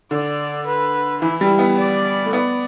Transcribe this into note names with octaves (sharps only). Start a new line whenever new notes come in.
D3 D5
B4
E3 E4
G3
B3
D5
A3
B3 D5